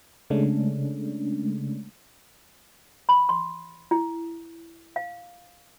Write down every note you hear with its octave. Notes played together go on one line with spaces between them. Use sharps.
C#3 G#3 A3 C#4 D4
B5
C6
E4
F5